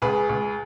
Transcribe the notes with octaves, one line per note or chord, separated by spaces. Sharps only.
C#2 G#4 B4
C#2